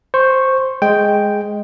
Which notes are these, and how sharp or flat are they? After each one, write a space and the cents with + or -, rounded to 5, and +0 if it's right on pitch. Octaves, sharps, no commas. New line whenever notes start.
C5 +0 C#6 -10
G#3 +0 G5 +0